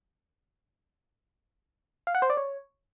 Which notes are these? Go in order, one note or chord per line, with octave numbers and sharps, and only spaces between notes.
F5
F#5
C5
D5
C#5